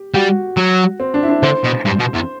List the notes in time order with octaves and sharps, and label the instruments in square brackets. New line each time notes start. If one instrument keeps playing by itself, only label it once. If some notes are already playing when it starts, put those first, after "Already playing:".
Already playing: [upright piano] G4
[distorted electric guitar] G3 [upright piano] F#4
[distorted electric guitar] F#3
[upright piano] C4
D4
E4
D4
[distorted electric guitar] D3 [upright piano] C5
[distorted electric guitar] B2
G2
B2
E2